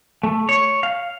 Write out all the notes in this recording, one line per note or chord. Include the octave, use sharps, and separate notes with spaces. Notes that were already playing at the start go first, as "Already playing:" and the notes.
A3
C#5
F5